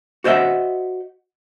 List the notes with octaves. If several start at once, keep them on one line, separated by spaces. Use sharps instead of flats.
F#4 C5 D#5 E5 F#5